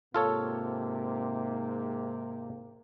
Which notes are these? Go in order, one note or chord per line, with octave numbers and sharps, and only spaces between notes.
G#2 C3 A#3 F4 A4 C#5